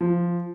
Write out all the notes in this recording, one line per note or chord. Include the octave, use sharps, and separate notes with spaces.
F3